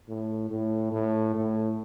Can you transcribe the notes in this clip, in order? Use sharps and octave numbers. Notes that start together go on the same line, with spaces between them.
A2
A2
A2
A2